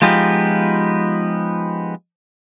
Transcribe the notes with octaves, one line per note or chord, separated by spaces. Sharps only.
F3 G#3 B3 D#4 F4 G4